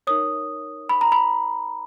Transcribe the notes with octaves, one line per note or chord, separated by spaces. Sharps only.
D#4 A#4 C#5 D#6
B5
A#5
B5